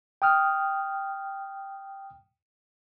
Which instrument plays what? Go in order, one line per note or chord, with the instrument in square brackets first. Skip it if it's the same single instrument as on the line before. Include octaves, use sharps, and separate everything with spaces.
[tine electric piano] G5 D#6 F6